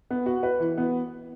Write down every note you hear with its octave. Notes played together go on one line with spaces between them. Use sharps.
B3
F#4
B4
E3
B3